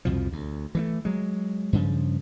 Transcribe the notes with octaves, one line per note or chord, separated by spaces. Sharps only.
C2 F2 B2 F3
D2
E3 G#3 A3
F#3 G#3
G2 C#3 F3